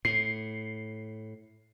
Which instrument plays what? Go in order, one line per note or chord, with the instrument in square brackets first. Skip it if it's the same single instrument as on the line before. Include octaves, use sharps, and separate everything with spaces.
[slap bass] A2 [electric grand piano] C7